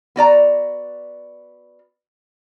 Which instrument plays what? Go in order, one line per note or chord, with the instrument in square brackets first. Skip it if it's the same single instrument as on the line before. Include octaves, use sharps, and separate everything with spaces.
[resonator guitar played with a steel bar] B3 F#4 D5 A#5